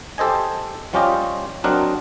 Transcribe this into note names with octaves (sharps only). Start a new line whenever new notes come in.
G4 A4 C5 D#5 G#5
F3 G3 C#4 F4 G4 D#5
F#3 C4 D4 A#4 D#5 F#5